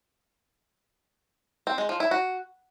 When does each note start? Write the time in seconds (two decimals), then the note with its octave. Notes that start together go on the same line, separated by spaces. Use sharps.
1.67 C4
1.78 G#3
1.89 F3
2.00 E4
2.11 F#4